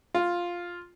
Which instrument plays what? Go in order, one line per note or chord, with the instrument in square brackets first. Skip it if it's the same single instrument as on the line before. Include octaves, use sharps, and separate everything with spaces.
[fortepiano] F4